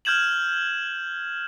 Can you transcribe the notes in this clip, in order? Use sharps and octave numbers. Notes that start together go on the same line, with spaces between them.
F6 G6 G#6 E7 F#7